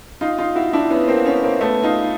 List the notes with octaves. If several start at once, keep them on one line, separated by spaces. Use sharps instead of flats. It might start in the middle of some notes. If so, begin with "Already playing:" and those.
D#4 F4
D#4 F4
E4 F#4
D4 E4
B3 C#4
A#3 C4
B3 C#4
A#3 C4
A3 B3
D#4 F4